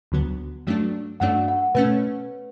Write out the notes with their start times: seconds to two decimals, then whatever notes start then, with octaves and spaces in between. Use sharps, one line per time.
0.12 D2 D3 F#3 B3
0.67 G2 F#3 A3 D4
1.20 G2 F#3 A3 D4 F#5
1.48 F#5
1.75 B2 A3 C#4 B4